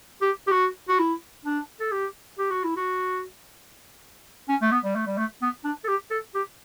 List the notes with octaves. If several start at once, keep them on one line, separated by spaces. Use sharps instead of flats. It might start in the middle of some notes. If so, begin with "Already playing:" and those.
G4
G4
F#4
F#4
E4
D4
A4
G4
G4
F#4
E4
F#4
C#4
A3
B3
G3
A3
G3
A3
B3
D4
A4
G4
A4
G4